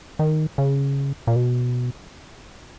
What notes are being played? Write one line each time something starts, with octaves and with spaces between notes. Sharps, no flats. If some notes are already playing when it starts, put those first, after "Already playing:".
D#3
C#3
A#2
B2